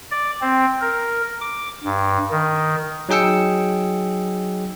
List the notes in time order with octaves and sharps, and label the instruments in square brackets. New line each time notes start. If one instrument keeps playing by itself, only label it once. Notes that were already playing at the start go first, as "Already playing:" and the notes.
[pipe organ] D5
C4
A#4
D6
G2
D#3
[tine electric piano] F#3 D#4 G#4 G5 E6 C#7